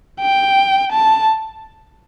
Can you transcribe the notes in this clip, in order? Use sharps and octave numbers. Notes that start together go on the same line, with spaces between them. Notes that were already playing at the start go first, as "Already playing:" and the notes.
G5
A5